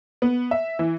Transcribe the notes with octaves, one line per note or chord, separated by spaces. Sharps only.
B3
E5
E3